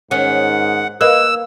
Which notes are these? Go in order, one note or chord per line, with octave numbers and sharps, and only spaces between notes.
G#2 D#3 C#4 F#5
A#3 B4 D#5 E6 F#6